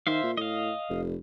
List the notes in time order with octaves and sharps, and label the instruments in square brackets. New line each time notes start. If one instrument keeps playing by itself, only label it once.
[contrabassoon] D#3 [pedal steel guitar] C5 E5 F5
[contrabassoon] A#2
[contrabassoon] A2 [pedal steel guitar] D#5 F5
[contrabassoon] F1